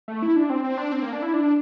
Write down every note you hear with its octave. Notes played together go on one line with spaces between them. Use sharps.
A3
E4
D4
C4
C4
D4
C4
A#3
D4
E4
D4